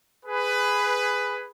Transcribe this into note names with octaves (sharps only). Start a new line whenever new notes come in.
G#4 B4